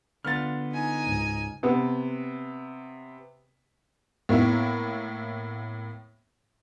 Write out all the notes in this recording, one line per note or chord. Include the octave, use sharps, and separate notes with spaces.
D3 B3 F4 F6 A6
D#4 G#5
C#2 G#2
C3 B3
A2 A#3 B3 E4